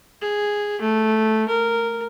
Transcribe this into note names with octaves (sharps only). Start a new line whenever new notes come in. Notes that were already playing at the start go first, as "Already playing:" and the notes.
G#4
A3
A#4